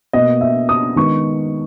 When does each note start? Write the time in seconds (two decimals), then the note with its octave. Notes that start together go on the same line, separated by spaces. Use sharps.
0.13 B2 A#3 D#5
0.41 E5
0.69 D#6
0.96 D#3 G#3 B3 C#6